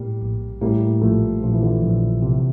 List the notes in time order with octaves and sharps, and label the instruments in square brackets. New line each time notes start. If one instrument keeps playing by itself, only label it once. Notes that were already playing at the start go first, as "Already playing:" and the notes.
Already playing: [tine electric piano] A2 [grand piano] G3 A#3
[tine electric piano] A#1
[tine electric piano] A2 [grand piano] G3 A#3
[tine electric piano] A#1 [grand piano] F3 A3
[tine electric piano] A#1 [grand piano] F3
[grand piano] E3
D3 F3
[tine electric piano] A#1
C3